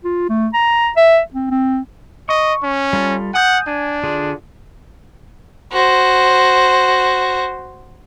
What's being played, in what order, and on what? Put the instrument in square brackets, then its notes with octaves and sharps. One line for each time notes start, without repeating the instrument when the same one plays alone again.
[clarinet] F4
A3
A#5
E5
C4
C4
[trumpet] D#5 [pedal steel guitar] C#6
[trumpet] C#4
[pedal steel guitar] G3 F4 A4
[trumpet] F#5 [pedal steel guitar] G#5 D#6 G6
[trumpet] D4 [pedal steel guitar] G#5
[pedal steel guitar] D3 F4 G#4
[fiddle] F#4 C5